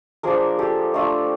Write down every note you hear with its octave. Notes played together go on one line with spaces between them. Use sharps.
F3 A#3 D4 G#4 A#4
G4 A4
A3 D4 F4